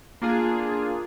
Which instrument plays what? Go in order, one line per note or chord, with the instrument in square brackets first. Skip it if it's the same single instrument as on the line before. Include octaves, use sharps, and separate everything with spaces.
[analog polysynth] A#3 D4 F4 G#4